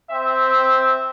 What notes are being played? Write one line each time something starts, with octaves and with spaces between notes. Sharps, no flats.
C4 E5